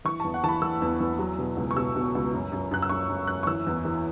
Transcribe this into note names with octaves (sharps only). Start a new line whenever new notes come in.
E3 C#6
E2 A5
F#5
E3 A5
B5
E3 E6
E2
E2
F#3
B2
C#2
C#6
B2 E6
B2
C#2
F#2
F#2
F#2 F#6
E6
F#2 C#6
F#2
F#2 F#6
C#6
E3 E6
E2
E3